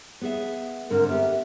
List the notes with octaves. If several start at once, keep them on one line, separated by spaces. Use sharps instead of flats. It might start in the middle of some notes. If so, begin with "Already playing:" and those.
B3 G#4 E5
G#2 D3 C4 A#4
B3 G4 E5